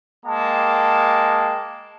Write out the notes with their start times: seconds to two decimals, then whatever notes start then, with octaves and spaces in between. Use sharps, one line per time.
0.25 G#3 A#3 G5 A5